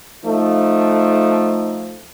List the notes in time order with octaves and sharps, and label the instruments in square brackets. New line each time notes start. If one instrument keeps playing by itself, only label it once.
[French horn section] F3 A3 [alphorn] D#4